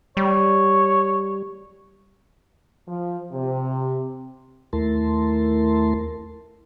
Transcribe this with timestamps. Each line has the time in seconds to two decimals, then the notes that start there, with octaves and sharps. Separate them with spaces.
0.17 G3 C#5
2.87 F3
3.32 C3
4.73 D#2 A3 E4 A#4 A5 C6